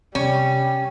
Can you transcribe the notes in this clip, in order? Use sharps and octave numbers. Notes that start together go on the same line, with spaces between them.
C3 G3 C#4